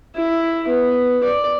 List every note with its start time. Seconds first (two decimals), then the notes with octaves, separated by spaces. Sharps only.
0.15 E4
0.68 B3
1.24 D5